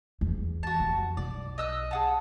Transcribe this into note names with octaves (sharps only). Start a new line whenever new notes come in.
E2
F#4 A5
F2
B1 D5
D#5 E6 F#6
G#4 F#5 A5